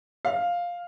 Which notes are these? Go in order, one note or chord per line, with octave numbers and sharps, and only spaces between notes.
F5